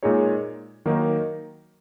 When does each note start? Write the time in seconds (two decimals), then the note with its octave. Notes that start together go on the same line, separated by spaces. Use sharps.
0.03 A#2 G#3 D#4 G#4 C#5
0.85 D#3 F#3 A#3 D#4 A#4